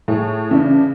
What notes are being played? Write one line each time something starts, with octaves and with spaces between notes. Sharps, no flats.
A2 G#4
C#3 E3 D4